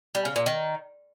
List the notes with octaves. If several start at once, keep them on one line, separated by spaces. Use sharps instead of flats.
G3
C#3
A#2
D#3